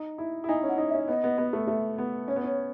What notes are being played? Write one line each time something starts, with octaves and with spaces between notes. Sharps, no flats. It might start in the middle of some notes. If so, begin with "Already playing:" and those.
Already playing: D#4
E4
E4
D#4 G#5
C#4
F#5
D#4
E5
C#4
B3 D#5
B3
B3
A3
A3
B3
C#4 C#5
B3
C#4